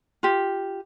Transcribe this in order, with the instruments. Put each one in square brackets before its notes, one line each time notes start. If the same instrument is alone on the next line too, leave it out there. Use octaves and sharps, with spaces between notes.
[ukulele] F4 G4